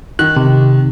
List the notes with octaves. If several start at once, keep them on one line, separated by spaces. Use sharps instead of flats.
D#3 F#6
C3